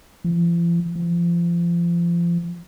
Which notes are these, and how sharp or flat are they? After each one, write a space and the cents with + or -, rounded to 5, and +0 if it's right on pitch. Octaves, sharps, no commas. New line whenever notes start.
F3 -45
F3 -30